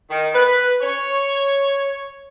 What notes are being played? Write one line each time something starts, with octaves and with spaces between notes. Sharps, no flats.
D#3
B4
C#5